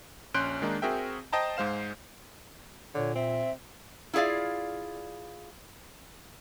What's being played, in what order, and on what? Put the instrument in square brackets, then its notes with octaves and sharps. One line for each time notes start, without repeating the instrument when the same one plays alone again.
[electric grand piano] A#1 C#4 C6 F#6 G6 D7
D#3 G#3 A#3 D4 D#4
C4 F#4 G#4 A#4 E5 G5
C5 D#5 G5 A5 A#5
G#2 G#3 C5 F5 E7
[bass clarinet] A#2 [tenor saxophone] D3 [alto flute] C#5
[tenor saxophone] C4 [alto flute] E5
[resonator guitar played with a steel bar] E4 F4 G#4 D5 F5